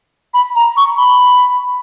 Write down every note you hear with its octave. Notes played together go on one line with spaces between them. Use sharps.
B5
A#5
C#6
B5